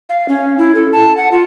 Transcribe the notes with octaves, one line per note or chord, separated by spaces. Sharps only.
F5
C#4
E4
A4
A5
F#5
F4